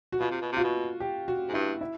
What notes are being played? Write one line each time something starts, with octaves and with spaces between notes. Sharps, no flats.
F#4
B2 F4
C3
B2
C3 F4
B2 F#4
G4
F#4
G#2
G2 E4
E4